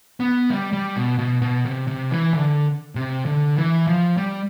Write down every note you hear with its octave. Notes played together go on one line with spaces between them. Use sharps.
B3
G3
G3
B2
B2
B2
C3
C3
E3
D3
C3
D3
E3
F3
G3